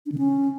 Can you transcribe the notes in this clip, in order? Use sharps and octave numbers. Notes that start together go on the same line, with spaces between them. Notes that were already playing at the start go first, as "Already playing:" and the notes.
D4
D3
C#4